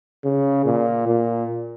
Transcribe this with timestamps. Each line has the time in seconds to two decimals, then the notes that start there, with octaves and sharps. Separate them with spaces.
0.24 C#3
0.65 A#2
1.07 A#2